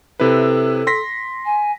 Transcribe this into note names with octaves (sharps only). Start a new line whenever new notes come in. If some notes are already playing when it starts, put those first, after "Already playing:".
C3 E4 A4 B4
C6 A#6 B6
G#5